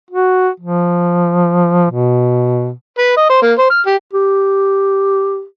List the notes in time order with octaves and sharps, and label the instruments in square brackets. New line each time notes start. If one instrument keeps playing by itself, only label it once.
[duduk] F#4
F3
B2
[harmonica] B4
D#5
C5
A#3
C5
F6
G4
[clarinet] G4